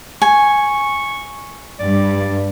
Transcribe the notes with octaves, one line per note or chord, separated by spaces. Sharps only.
G#5 C#6
G2 D5